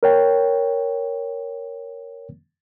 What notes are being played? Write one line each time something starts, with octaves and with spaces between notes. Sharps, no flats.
A#4 C#5 G5